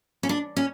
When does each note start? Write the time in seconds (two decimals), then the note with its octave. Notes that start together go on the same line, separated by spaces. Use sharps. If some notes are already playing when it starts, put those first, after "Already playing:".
0.23 C#4
0.29 D4
0.56 C#4